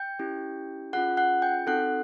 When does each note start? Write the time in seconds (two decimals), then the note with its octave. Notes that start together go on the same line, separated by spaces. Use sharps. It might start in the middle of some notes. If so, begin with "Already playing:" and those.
Already playing: G5 G6
0.19 C#4 E4 G4
0.93 C#4 F4 G#4 F#5 F#6
1.17 F#5 F#6
1.42 G5 G6
1.66 C4 D#4 F#4 A4 F#5 F#6